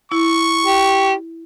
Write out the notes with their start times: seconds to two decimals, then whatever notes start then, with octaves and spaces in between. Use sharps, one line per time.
0.12 E4 C#6
0.66 G4